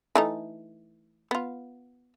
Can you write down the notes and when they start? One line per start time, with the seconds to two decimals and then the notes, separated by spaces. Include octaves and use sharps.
0.15 E3 A3 D#4
1.31 B3 F4